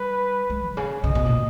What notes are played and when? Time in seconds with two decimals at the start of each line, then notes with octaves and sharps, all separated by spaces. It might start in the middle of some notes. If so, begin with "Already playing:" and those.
Already playing: G3 B4
0.50 G#3
0.69 B2
0.77 C#3
1.04 C#3 D#5
1.15 B2
1.25 A#2